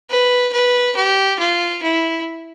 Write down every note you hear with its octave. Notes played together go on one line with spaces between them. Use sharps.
B4
B4
G4
F4
E4